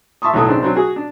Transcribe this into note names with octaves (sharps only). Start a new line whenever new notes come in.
E5 A5 C6 C#6 D#6
B1 A2 F#3 A4 D#6
C#3 C4 D4 D#4
F#3 C4 D4
F#4 G#4
D4